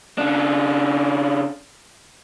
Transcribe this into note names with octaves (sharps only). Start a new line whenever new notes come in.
C#3 D4